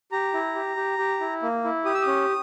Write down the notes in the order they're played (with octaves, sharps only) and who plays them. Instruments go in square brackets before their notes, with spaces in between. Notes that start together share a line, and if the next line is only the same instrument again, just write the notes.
[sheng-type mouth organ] G4 A#5
E4
G4
G4
G4
E4
A#3
E4
G4 D#6
E6
C#4 D#6